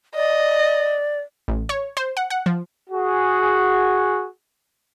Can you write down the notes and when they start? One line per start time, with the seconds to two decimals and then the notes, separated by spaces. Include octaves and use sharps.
0.15 D5 D#5
1.48 A1
1.69 C#5
1.97 C5
2.17 F#5
2.30 F#5
2.46 F3
2.90 F#4 G#4